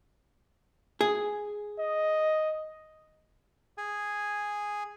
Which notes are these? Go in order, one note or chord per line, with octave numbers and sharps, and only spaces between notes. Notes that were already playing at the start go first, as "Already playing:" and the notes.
G#4
D#5
G#4 G#5